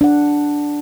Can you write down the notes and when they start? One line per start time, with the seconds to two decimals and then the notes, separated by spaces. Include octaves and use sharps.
0.01 D4 F#5